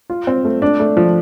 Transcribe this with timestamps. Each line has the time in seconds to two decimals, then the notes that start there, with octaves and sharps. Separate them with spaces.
0.10 F4
0.27 C4
0.45 A3
0.62 D4
0.80 A3
0.97 F3